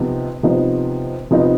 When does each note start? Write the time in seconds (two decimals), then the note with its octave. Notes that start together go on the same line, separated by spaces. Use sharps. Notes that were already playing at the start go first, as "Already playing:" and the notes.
Already playing: C3 F3 B3 D#4
0.43 C3 F3 B3 D#4
1.31 C3 F3 B3 D#4